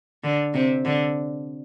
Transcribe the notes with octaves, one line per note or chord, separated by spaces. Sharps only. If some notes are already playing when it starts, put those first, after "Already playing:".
D3
C3
D3